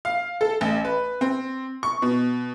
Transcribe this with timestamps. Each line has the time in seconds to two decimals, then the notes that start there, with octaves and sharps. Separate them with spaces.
0.05 F5
0.41 A4
0.61 A1
0.85 B4
1.21 C4
1.83 C#6
2.02 B2